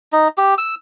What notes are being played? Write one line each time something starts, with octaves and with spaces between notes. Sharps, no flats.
D#4
G4
E6